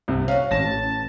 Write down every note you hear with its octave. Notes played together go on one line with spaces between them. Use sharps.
C2 C3
C#4 F#4 F5
A1 A5 A#6